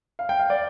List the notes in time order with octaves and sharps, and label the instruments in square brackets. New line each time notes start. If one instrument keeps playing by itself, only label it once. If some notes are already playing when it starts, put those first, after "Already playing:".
[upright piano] F5
G5
F5
D5